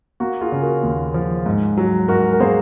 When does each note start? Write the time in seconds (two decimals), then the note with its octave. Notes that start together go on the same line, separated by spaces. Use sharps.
0.20 A#3 F#4
0.41 F4 G#4
0.52 C#3
0.62 F#4 A#4
0.83 D#2
1.14 F3
1.46 G#2
1.77 F#3
2.08 G#2 F#4 A#4
2.33 A#4
2.40 A#3 G#4 C5